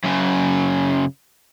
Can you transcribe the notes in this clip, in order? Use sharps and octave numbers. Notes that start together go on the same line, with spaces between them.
F#2 C#3